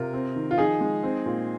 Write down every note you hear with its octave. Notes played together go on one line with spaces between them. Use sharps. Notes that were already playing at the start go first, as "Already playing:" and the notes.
Already playing: C3 F4 A#4
C4
D#3
F4
F3 D#4 G#4
G#3
C4
A#2